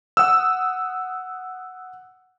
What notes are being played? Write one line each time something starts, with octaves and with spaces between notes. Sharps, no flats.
F#5 D#6 E6